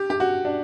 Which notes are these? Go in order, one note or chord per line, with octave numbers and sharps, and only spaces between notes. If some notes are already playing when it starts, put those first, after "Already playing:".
Already playing: G4
G4
F#4
D4